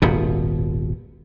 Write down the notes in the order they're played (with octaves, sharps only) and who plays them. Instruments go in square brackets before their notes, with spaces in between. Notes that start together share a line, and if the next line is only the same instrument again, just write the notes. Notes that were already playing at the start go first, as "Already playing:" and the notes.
[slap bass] D#1 G#1 B2